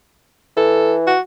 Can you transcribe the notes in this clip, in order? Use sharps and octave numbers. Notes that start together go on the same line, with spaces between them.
E3 A4
F#4